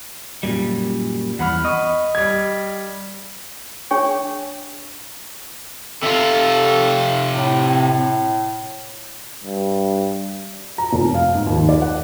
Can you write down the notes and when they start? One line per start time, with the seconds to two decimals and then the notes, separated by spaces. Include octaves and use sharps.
0.43 F#2 A#2 G3
1.39 E2 F#5 B5 F6
1.65 D#5 B5 C#6
2.15 G3 G#6
3.91 D4 G#4 C#5 G5 C#6
6.03 C3 F4 A4
7.32 A2
9.44 G2
10.78 A#5
10.93 F1
11.14 F5
11.35 G#2
11.47 D#2
11.69 D5
11.82 F#5